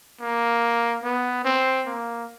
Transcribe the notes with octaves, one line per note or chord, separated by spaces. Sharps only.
A#3
B3
C4
A#3